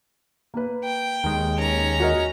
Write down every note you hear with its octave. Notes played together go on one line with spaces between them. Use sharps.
A#3 B4
G5
D#2 D#3 G#3
C#4 A#5
F#4 A#4 D#5